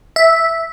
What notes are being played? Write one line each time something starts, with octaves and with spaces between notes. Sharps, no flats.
E5